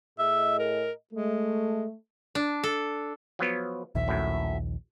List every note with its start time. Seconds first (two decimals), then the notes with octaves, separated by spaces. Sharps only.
0.19 A2 G#4 D#5 E5
0.59 A#4
1.13 G#3 A3
2.35 D4
2.63 A4
3.39 F3 F#3 B3
3.95 A#1 D#2 E5
4.08 F#2 A2